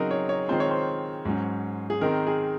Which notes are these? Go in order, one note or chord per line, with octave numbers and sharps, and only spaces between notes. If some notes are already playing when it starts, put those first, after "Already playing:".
Already playing: C#3 F#3 C4 D#4 G#4 A#4
C#5
C#5
D#3 G#3 C4 F4 C5
C#5
C5
G#2 F#3 C#4
G#4
D#3 G#3 C4 A#4
G#4